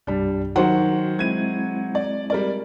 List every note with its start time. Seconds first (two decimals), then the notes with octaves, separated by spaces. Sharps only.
0.07 C2 G2 G3 D4
0.56 D#3 F#3 F#4 C5 F#5
1.19 G#3 C4 E4 G#6 D#7
1.95 D5
2.30 G3 A#4 D5